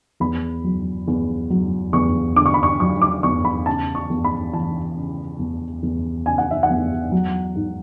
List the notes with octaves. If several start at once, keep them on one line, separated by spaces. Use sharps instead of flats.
E2 B5
F#3
E2
F#3
E2 C#6
D3 D6
C#6
B5
C#6
F#3 C#6
D6
E2 C#6
B5
C#3 A5
C#6
E2
B5
E3 A5
C#3
E2
E2
C#3 G#5
F#5
E5
F#5
E2
F#3
G#2